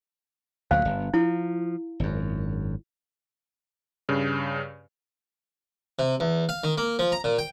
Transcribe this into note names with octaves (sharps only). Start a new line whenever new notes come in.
D2 A#2 F#3 C5 F5
G1
F3 E4
G#1 F#2
G2 C#3
C3
E2
F5
D#3
A#3
F3
A#5
A#2
G5